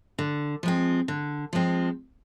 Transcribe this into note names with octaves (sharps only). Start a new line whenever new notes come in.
D3
F3 G#3 C4
D3
F3 G#3 C4